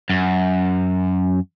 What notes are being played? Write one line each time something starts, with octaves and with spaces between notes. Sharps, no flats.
F#2